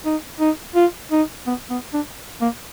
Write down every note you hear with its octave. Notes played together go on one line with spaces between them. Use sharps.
D#4
D#4
F4
D#4
B3
B3
D4
A#3